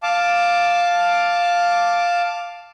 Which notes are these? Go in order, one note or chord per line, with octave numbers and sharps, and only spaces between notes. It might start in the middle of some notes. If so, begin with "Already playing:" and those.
F5 A5 D6